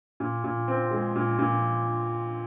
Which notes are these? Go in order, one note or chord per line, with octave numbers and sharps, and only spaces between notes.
A#2
A#2
C4
G#3
A#2
A#2